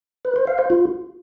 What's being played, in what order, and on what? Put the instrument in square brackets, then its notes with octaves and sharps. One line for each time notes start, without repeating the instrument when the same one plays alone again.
[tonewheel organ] B4
C5
F5
C5
F4